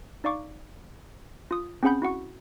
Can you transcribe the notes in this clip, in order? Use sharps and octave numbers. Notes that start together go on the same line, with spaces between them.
D#4 D5 F5 C#6 D6
F4 D#6
C4 C#4 G#4 F#5 B5 G6
E4 F#4 F#5 C#6